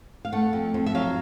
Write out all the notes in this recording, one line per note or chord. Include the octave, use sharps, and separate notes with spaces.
F5
A3 F#5
F2
F2
E5
F#3 F5